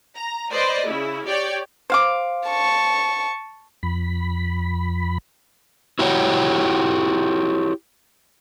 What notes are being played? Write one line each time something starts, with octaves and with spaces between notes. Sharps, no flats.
A#5
B4 C5 D5 D#5
C#3 E4
G4 C#5 D5 G5
C5 F5 D6
A5 C#6
F2 B5
E4 F#4 G4 C#5 F#5